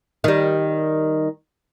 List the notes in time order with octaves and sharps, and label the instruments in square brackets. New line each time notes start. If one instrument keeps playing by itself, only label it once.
[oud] D#3 G3